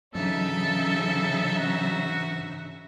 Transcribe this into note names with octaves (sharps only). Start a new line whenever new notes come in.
G#2 C#3 E3 F#3 D4 D#4 A4 E5
F#4